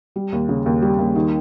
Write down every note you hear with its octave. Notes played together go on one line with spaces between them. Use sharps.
G3
D#2
C#3
D#2
G3
D#2
D#3